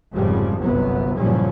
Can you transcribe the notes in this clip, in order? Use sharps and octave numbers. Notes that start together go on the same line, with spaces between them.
F1 G#2 C#3 F3 G3
G1 C2 F#2 C3 F#3 B3
F#1 G2 A#2 F3 G3 C#4